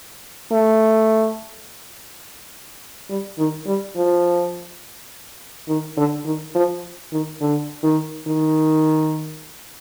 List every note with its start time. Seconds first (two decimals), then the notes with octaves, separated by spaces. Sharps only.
0.52 A3
3.10 G3
3.38 D#3
3.67 G3
3.96 F3
5.68 D#3
5.97 D3
6.25 D#3
6.55 F3
7.12 D#3
7.41 D3
7.83 D#3
8.27 D#3